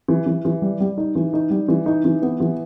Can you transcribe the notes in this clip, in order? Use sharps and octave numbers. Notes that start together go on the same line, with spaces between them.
E3
E3
E3
G3
G3
D#4
E3
D#4
G3
E3
D#4
E3
B3
E3